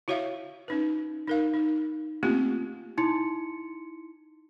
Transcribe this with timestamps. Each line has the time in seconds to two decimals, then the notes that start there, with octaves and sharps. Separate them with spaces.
0.08 E4 F#4 C#5 E5 F5
0.68 C#4 D#4 B4
1.27 D#4 A#4 F5
1.54 D#4
2.23 A3 A#3 C4 C#4 F4 G4
2.98 D#4 E4 C6 C#7